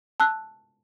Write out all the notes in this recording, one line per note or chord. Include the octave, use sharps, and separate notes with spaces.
A5 E6 F#6